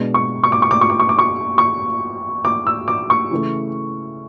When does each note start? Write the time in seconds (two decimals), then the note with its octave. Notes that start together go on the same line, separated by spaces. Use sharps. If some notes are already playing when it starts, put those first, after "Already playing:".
Already playing: B2 G#3 B3 D4
0.14 C#6
0.43 C#6
0.52 D6
0.62 C#6
0.71 D6
0.81 C#6
0.90 D6
1.00 C#6
1.09 D6
1.19 C#6
1.58 C#6
2.45 D6
2.67 E6
2.88 D6
3.10 C#6
3.31 C#3 E3 A3